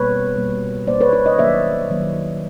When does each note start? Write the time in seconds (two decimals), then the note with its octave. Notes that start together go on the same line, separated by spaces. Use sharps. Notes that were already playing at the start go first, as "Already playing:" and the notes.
Already playing: B2 G3 A#3 B4 C#5
0.36 B2 G3 A#3
0.87 B2 G3 A#3 C5 D5
1.01 B4 C#5
1.13 B4 C#5
1.26 C#5 D#5
1.38 D#3 F#3 A#3 D5 E5
1.90 D#3 F#3 A#3